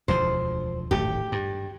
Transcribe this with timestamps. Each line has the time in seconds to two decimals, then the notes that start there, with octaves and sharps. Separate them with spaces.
0.08 E1 D2 F3 C5
0.91 D1 G#1 A3 G4
1.32 G2